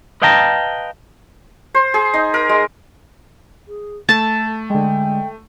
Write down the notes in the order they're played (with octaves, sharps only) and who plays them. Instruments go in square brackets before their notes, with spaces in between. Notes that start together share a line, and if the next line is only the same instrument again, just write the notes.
[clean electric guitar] B4 D#5 F5 G5 A5 A#5
[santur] C5
G#4
D#4
A#4
G#3
[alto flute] G#4
[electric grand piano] A3 [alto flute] A4 [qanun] A5
[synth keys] D3 G#3 [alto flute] G5